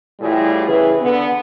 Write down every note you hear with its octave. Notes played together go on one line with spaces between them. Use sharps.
A2 E3 G3 F4 G#4
C#3 E3 G#4 B4
D3 B3